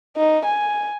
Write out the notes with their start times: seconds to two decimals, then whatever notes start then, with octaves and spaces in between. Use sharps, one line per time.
0.17 D#4
0.46 G#5